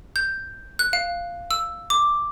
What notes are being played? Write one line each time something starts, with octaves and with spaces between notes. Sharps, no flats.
G6
F#6
F5
E6
D6